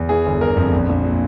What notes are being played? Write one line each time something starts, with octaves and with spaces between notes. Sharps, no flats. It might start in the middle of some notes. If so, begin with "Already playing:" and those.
Already playing: E2
E3 G#4
G1
G1 A#4
F2
A#1
A#1
A#2